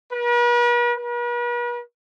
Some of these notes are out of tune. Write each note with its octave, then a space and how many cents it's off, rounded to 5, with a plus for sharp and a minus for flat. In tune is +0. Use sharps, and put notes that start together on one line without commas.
B4 -45
B4 -45